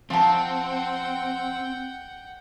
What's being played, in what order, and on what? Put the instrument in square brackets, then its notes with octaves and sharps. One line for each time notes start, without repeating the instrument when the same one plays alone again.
[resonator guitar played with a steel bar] F3 A5 [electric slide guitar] C4 [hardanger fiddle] F#5 G5